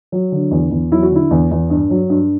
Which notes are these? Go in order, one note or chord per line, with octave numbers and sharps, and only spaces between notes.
F#3
D3
E2
E2
F#3 E4
F#4
D3 E4
E2
E2
G2
F#3
G2